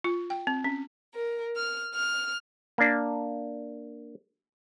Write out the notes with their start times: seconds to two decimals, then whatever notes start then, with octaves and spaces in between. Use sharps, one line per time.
0.04 F4
0.30 G5
0.47 C4
0.64 C#4
1.15 A#4
1.56 F6
1.95 F6
2.78 A#3 D4